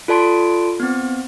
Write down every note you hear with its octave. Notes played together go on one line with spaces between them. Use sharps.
F4 A4 D5 A5 C6 D7
B3 C4